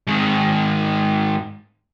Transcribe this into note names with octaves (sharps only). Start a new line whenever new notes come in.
G#2 D#3